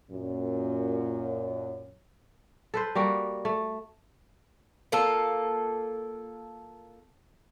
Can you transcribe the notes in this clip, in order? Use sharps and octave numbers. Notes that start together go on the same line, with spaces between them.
F#2 A#2
A4 B4 C5
G3 A#3 F#4
A3
A#3 F4 A4